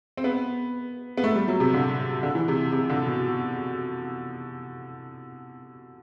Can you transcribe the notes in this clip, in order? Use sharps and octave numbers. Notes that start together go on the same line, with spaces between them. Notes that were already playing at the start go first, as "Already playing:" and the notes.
C4
B3
B3
A3
G3
F#3
C3
D3
D3
E3
C3
C3
D3
B2